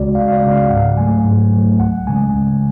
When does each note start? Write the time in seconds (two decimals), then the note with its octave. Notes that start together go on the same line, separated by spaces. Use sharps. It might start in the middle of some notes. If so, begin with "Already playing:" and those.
Already playing: C#2 C#3 G#3 F#4 D5
0.15 C#2 F5
0.28 F5
0.33 D5
0.42 C#3 G#3
0.52 F5
0.70 G#2 F#5
0.97 F#3 A3 G#5
1.25 G#2
1.52 F#3 A3
1.79 C#2 F#5
2.07 C#3 G#3 G#5
2.35 C#2